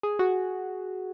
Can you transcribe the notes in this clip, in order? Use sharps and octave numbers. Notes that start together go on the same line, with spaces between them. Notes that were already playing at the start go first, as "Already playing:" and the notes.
G#4
F#4